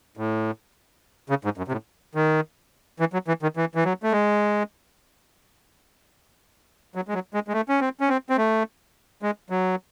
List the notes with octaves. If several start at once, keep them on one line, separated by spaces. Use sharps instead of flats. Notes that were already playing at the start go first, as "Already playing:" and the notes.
A2
C#3
G#2
F#2
C3
A2
D#3
E3
F#3
E3
D#3
E3
E3
F#3
A3
G#3
F#3
G#3
F#3
G#3
G#3
A3
C#4
C4
C#4
C4
C4
A3
G#3
F#3